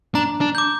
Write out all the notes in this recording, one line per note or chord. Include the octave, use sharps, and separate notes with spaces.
D4 A#5
D4
D6 G6